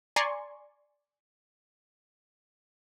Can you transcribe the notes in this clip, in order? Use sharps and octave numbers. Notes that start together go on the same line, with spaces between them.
D5 G#5 A#5 C6 C#6